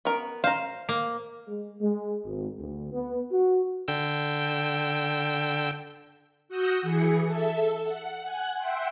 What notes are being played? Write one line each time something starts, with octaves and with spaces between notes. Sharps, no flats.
B3 A#4
C5 F5 A#5
A#3
G#3
G#3
G#1
D2
B3
F#4
D3 G5 E6
F#4 F#5 D#6 E6 G6 A#6
E3 G#4 C#7
A4 E5
F#5
F#5 G#5 F#6
E5 F#5 G5 C6